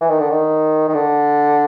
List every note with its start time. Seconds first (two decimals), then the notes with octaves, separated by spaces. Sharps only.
0.01 E3
0.10 D#3
0.20 D3
0.30 D#3
0.88 D#3
0.94 D3